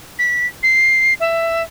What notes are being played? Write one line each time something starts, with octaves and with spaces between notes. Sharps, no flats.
B6
C7
E5